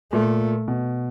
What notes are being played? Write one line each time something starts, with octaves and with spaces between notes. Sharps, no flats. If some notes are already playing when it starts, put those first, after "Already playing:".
A#2 A3
B2